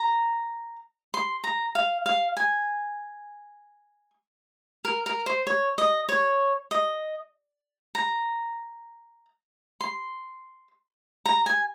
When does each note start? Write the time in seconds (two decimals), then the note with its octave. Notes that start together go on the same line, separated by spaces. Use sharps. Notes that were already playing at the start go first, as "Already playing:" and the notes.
Already playing: A#5
1.14 C6
1.44 A#5
1.75 F5
2.06 F5
2.37 G#5
4.85 A#4
5.06 A#4
5.26 C5
5.47 C#5
5.78 D#5
6.09 C#5
6.71 D#5
7.95 A#5
9.81 C6
11.26 A#5
11.46 G#5